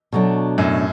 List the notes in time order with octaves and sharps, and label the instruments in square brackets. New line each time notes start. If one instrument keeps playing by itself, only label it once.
[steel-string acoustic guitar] B2 F#3 A3 D4
[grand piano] F#2 A2